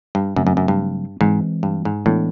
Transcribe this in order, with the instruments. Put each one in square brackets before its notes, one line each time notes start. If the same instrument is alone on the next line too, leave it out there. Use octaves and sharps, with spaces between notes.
[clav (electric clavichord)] G2
[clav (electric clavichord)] F#2 [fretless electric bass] C#3 F#3 A3 C4
[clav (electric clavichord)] F#2
F#2
G2
[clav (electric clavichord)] G#2 [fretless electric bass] E3 G#3 C4
[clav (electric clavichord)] G2
G#2
[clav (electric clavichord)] A2 [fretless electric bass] E3 G#3 B3 D4